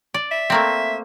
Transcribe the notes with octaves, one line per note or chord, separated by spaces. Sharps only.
D5
E5
A3 A#3 C4